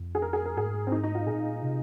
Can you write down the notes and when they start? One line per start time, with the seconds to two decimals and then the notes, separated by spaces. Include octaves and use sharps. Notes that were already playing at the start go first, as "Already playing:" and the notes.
Already playing: F2
0.15 G#4
0.22 A#4
0.33 G#4
0.46 A#4
0.57 G#2 G#4
0.87 C4
0.92 D#4
1.03 D#4
1.15 F4
1.26 A#2 G#4
1.62 C3